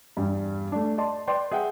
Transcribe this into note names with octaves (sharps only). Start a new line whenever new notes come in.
E2 G2 G3
A3 D4
D5 D#5 A5 C6
B4 D5 G5 C6
G#4 E5 F#5 G5